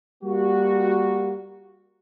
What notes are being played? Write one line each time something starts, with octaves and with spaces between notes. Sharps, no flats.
G3 A#3 F#4